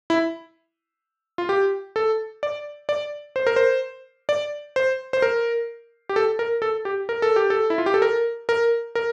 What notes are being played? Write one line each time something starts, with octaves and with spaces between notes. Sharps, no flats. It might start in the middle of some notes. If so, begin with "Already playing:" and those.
E4
F4
G4
A4
D5
D5
C5
A#4
C5
D5
C5
C5
A#4
G4
A4
A#4
A4
G4
A#4
A4
G4
A4
E4
F4
G4
A4
A#4
A#4
A#4